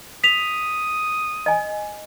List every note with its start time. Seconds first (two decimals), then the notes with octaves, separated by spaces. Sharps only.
0.24 D#6 B6 F7
1.46 D#5 G#5